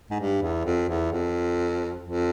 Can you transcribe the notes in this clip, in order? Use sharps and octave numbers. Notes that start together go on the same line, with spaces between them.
G#2
G2
E2
F2
E2
F2
F2